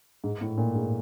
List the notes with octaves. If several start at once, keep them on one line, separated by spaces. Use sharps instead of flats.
G#2
A2
A#2
G#2